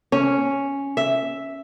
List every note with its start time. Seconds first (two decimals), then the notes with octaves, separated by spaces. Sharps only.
0.12 C#4
0.97 E5